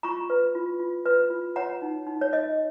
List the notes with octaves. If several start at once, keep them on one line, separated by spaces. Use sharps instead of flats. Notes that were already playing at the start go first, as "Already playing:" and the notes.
F4 A#5 C#6
B4
F4
F4
B4
F4
C#5 F#5 A#5
D#4
D#4
C#5
C#5 D#5